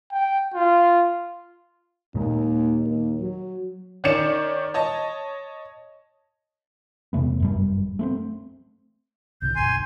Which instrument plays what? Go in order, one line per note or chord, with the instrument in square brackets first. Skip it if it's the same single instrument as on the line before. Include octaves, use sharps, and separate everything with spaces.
[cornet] G5
F4
[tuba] D#2 [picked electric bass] A#2 G#3 A#3
[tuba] D#2
F#3
[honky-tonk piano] D#3 C#4 C#5 D5 C#7 E7
C#5 D#5 A5
[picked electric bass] E2 C3 A3 B3
G1 F#2 G3
A3 B3 C4
[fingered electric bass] C2 A2 D3 [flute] G6
[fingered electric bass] F#1 B1 F#2 [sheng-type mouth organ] G#5 C6